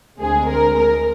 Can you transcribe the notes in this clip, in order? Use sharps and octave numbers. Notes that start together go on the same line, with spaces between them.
D2 D3 G#3 C4 G#4
A#4
A#4